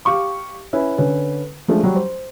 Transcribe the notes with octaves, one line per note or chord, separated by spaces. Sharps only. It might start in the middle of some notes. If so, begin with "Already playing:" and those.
G4 F5 C#6 D6
C#4 E4 B4
D3 C#4 B4
F3 G#3 A3 D4
F#3 G3
C5